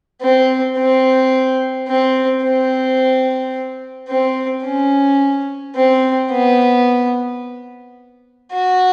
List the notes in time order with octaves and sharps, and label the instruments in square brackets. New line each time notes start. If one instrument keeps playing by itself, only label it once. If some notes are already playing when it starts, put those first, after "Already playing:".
[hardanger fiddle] C4
C4
C4
C4
C4
C#4
C4
B3
F#4